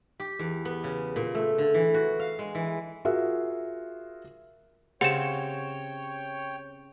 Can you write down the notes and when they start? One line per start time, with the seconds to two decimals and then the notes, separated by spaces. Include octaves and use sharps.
0.20 G4
0.39 E2
0.65 B3
0.84 C#3
1.16 A#2
1.35 A3
1.58 D3
1.74 E3
1.94 F#4
2.19 F5
2.39 G#3
2.55 E3
3.05 F4 F#4 G#4 A#4 E5
5.01 C#3 C4 G4 C#5 F#5 G5 E7